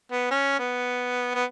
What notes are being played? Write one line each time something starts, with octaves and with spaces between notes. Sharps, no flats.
B3
C#4
B3
B3